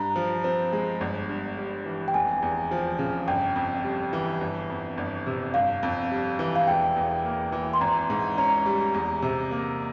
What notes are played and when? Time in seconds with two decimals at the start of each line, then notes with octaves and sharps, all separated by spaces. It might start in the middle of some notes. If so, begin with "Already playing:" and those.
Already playing: G2 A#5
0.16 F3
0.44 C4
0.73 G#3
1.01 G1
1.29 G2
1.57 G3
1.86 E3
2.08 G5
2.14 F1 G#5
2.42 E2
2.71 F3
2.99 C#3
3.28 G1 G5
3.56 F2
3.84 G3
4.13 E3
4.41 G1
4.70 F2
4.97 G1
5.26 C3
5.54 G1 F5
5.83 F2
6.11 G3
6.39 E3
6.56 F5
6.67 E1 G5
6.97 E2
7.24 A#3
7.52 E3
7.73 C6
7.81 G#1 A#5
8.10 G#2
8.38 C#4 A#5
8.66 G3
8.94 E2
9.22 C3
9.51 A#3